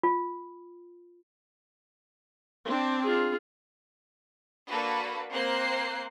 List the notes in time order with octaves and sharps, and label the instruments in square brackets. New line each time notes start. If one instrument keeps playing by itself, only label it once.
[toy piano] F4
[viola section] C4 D4
[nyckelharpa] F4 G#4
[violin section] A#3 D4 F#4 A4 B4
A#3 C4 C5 F#6 C7